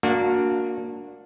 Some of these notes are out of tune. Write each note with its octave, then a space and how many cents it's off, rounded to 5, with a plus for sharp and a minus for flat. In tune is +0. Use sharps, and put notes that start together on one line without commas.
A#3 +0 D4 +0 F#4 -25